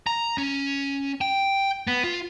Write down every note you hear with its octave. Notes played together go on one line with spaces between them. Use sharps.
A#5
C#4
G5
B3
F4